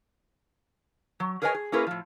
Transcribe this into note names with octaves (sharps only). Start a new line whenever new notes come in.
F#3
G#4 A#4 B4 C#5 D#5 G#5
G#4
A#3 C#4 E4 G#4 A#4 B4
A2 F3